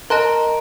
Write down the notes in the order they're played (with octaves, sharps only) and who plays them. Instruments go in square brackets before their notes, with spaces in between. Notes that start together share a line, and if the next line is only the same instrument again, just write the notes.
[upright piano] A#4 [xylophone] D#5 A5 C6 F#6